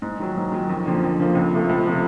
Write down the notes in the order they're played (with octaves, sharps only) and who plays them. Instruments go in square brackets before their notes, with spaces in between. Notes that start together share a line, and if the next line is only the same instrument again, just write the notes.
[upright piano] G#2
D#3 F#3
G#2
D#3 F#3
F2
D3 F3 A#3
F2
D3 F3 A#3
C#2
C3 F3 A3
C#2
C3 F3 A3